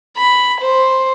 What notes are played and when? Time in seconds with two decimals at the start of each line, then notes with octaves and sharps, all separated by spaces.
0.17 B5
0.61 C5